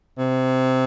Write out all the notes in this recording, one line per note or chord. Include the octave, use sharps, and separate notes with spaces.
C3